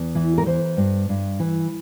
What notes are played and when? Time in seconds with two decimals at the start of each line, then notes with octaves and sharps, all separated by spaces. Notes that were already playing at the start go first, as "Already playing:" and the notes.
Already playing: E2
0.15 E3
0.38 A#4
0.46 E3 C5
0.77 G2
1.09 G2
1.40 E3